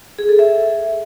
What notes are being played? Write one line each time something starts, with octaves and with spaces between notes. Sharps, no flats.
G#4
A4
E5